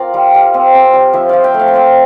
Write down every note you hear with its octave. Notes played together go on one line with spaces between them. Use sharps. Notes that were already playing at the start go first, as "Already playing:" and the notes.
Already playing: C4 F4 A#4 C5 D5
G3
G3
C4
C4
G3
F3 C5 E5
F3 D5 F5
E5 G5
A3
F5
G5
C4 D5 F5